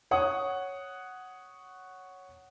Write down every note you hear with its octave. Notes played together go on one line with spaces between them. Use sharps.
C#5 F#5 D#6